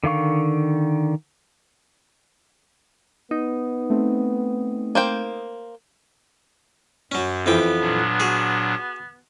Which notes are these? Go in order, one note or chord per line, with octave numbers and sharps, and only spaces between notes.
D3 D#3 F5 C#6
B3 D#4
A3 C4
A#3 C5 G5
F#2 F#3 C#4
F2 E3 B3 G5
A#2 F#3 D4
F#4 G#4